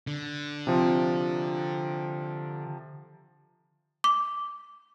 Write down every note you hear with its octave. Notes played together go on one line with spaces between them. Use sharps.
D3
C3 F3
D6